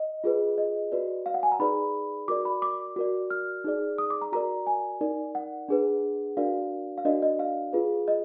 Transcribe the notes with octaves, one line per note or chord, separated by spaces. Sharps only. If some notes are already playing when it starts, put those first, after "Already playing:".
Already playing: D#5
F4 G#4 B4
D#5
F#4 B4 D5
F5
F#5
G#5
A#5
D#4 G#4 B4 D5 B5
F#4 A#4 D5 D6
B5
D6
F#4 A#4 D5
F6
D#4 G#4 D5
D#6
D6
A#5
F#4 A#4 D5 A#5
G#5
D#4 A#4 D5
F#5
D4 G#4 B4
D4 F#4 A#4 D5 F5
F5
D4 F#4 A#4 D5 D#5
D#5
F5
F4 G#4 B4
D#5